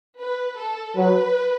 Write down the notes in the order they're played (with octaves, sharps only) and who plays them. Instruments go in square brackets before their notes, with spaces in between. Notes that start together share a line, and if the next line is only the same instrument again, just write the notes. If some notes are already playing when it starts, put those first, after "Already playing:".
[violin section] B4
A4
[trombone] F#3 [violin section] B4